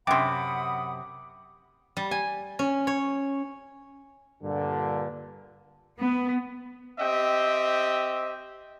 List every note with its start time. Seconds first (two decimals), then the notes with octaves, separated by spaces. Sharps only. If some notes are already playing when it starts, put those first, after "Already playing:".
0.07 F#2 C3 F#5 G5 B5 C6 D6 D#6
1.97 G3
2.11 G#5
2.59 C#4
2.87 C#5
4.43 G2 A#2 D3
5.98 B3
7.00 C4 G4 D#5 E5 G5